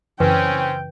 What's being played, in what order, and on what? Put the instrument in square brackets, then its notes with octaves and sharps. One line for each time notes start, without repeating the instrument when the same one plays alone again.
[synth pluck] F#2 C#3 E3 [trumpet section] C4 C#4 [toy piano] B4 [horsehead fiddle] G5